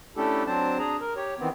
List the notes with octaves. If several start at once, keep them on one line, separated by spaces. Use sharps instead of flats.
A3 C#4 D4 E4 G4 A4
F#3 C4 D4 C5 A5
D4 G#4 A#5
A#4
G4 C#5
D#3 E3 B3 C4